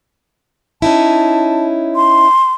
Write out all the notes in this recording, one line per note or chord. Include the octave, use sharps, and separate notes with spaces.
C#4 D#4 E4 A5
C6